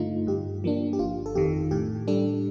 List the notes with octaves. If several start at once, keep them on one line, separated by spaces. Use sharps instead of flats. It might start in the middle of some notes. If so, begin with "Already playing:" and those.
Already playing: G2 D3 A3 D#4 F4
G2 G4
F3 A#3 D4
G4
G1 F4
A4
F2 D#3 G4
A2 G4
G3 D4 A4